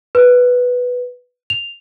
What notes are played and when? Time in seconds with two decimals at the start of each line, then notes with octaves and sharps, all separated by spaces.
0.15 B4
1.50 F7